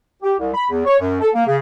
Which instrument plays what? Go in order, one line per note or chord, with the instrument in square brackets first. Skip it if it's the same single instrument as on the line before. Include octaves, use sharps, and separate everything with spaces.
[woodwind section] G4
C2
B5
E2
C#5
F#2
A4
A#3
C#3